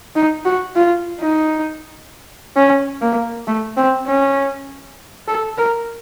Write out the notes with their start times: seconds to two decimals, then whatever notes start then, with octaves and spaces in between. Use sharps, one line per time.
0.16 D#4
0.46 F#4
0.76 F4
1.21 D#4
2.56 C#4
3.02 A#3
3.47 A3
3.77 C4
4.07 C#4
5.28 A4
5.58 A#4